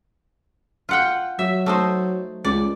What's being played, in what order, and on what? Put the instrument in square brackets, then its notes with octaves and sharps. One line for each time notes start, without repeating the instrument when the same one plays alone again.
[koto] F4 F#5 G5
[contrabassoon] F#3 [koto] E5
[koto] A3 D#4 C5
[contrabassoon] C#2 [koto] D5